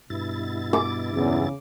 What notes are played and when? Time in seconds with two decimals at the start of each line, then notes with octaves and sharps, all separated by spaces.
0.10 G2 B2 E4 A6
0.73 D6
1.14 B1 E2 C#3